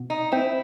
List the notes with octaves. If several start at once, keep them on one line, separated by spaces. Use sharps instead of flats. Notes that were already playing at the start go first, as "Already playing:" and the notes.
Already playing: B2
D#4
C4 E4